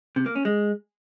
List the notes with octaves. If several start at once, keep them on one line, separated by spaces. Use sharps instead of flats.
C3
A#3
C#4
G#3